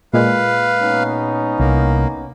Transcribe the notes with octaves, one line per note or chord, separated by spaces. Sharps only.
A#2 G#3 B4 F5
B3 C#4 D#4
C2 A#3